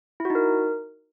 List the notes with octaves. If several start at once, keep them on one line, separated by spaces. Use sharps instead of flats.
E4
F#4
D#4
A#4